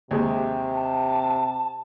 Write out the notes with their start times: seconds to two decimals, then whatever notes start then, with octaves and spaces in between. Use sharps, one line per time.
0.11 D#2 C3 G#3
0.74 A5